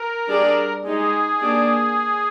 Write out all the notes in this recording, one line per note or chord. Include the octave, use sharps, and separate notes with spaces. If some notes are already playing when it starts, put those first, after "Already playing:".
Already playing: A#4
G3 D4 G#4 D5
G#3 D#4 G4 G#4
A#3 D4 G4 D5